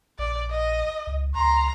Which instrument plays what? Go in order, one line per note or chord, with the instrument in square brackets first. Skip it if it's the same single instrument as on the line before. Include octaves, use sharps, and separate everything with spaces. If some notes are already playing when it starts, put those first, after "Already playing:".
[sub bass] A#1 [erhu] D5
[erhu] D#5
[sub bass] C#2
[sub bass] C#2 [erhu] A#5 [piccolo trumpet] C6